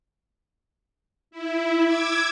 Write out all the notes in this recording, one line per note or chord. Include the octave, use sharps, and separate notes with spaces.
E4
D6 E6 G#6